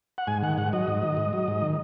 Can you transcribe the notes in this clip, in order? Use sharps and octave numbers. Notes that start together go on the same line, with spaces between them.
F#5
G#2 G#5
D#3 F#5
G#2 F#5
F#3 D#5
G#2
D#3
G#2
F#3
G#2
D#3